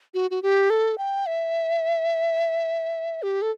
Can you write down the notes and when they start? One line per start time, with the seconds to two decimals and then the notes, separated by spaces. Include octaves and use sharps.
0.14 F#4
0.31 F#4
0.42 G4
0.70 A4
0.98 G5
1.26 E5
3.22 G4
3.42 A4